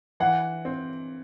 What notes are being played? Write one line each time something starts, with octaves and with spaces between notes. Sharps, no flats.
E3 F#5
C4